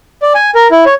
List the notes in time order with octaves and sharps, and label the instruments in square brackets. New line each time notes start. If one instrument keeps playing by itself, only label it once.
[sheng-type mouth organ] D5
G#5
A#4
E4
C#5